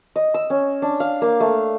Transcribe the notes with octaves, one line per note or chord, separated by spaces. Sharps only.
D#5
E6
C#4
D4
F5
A#3
A3